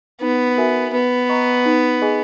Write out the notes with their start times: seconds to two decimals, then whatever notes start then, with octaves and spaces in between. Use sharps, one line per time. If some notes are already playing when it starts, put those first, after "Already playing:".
0.21 B3 D#4
0.57 F#4 A#4 E5 G#5
0.93 B3 B4
1.29 D#5 A#5 C#6
1.66 D#4
2.02 G#4 D#5 G#5